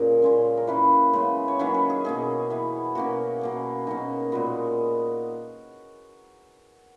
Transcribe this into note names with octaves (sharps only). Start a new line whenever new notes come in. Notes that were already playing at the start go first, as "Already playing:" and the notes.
Already playing: A#2 C#3 G#4 A#4
A#2 G#3 C#4
A#4
E3 A#3 C#4 B4
C#3 G#3 B3
C#5
D#3 F#3 A#3 C#4 B4
B4
G#4
B2 A#3 C#4 G#4
E3 B3
B2 A#3 C#4 F#4
B2 A#3 C#4
B2 A#3 C#4 D#4
A#2 G#3 B3 F#4